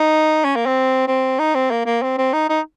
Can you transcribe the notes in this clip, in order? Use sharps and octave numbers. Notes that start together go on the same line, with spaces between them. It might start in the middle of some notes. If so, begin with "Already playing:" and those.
Already playing: D#4
C#4
A#3
C4
C4
D#4
C4
A#3
A#3
C4
C4
D#4
D#4